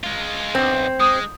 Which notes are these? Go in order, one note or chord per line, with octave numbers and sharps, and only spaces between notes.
G#3 F4
B1 C4
G#3 D#6